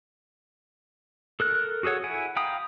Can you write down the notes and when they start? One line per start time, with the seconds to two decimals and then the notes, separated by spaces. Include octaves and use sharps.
1.40 A4 A#4 F#6
1.83 F#4 G#4 A4 C#5 F#5
2.04 E4 F#5 G#5
2.36 F5 G5 A#5 B5 D#6